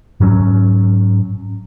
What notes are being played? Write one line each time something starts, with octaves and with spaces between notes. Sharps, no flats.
G#2 F#3 C#4